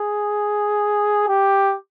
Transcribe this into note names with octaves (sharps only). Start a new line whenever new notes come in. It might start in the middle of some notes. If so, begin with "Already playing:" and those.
Already playing: G#4
G4